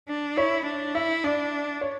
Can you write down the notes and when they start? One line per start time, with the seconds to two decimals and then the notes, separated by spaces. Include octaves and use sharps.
0.08 D4
0.37 E4 C#5
0.66 D4
0.95 E4 E5
1.24 D4 D5
1.81 C#5